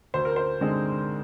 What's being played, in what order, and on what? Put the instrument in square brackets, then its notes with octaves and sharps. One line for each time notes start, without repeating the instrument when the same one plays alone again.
[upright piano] D2 C5
A#4
C5
D3 G#3 C4 D#4